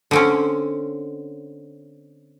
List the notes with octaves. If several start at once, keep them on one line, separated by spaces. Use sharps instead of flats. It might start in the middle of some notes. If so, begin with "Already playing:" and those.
D3 C4 C#4